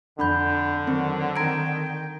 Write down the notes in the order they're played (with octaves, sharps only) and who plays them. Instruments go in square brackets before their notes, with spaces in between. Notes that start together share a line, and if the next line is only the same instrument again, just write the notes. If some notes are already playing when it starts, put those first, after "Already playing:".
[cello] F2 [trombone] D3 [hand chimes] D4 B5 G6
[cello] D#3 F#3 [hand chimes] C4
[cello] D#3 G5 [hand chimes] A#5 G#6 D7